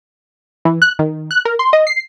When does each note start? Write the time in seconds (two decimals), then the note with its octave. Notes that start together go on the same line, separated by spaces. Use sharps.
0.65 E3
0.82 F#6
0.99 D#3
1.31 F#6
1.45 A#4
1.59 C6
1.73 D#5
1.87 C7